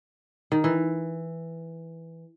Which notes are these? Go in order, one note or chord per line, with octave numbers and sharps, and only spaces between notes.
D#3
E3